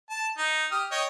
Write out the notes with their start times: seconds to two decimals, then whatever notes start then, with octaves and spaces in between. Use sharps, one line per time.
0.10 A5
0.38 D#4
0.72 G4 D#6 F6
0.91 C#5 D#5 G5